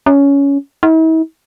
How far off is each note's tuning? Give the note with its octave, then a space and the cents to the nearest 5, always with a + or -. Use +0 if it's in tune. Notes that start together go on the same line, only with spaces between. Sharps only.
C#4 +15
E4 -45